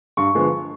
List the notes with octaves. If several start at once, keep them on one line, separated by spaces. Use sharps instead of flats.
G2 C#6
D3 F3 G#3 B3